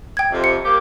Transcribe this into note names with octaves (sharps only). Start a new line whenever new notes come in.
G5 G#6
F2 C3
C#7
A#3 G4